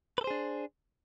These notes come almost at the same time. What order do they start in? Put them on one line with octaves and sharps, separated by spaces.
B4 A4 C5 G#4 D4